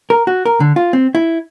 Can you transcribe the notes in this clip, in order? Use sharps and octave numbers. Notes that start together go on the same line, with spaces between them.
A#4
F#4
A#4
D3
F4
C4
E4